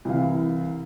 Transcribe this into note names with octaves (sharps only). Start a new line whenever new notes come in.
C2 E3 F5